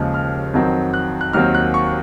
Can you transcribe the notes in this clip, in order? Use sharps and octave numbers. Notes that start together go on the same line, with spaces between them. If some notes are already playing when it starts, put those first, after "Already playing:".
Already playing: D#2 C#3 F3 G#3
F6
F2 D#3 F#3 C4
F#6
F#6
D#2 D#3 F#3 C4 F6
F#6
C#6